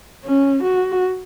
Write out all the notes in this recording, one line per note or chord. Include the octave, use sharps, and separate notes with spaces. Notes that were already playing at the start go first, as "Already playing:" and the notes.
C#4
F#4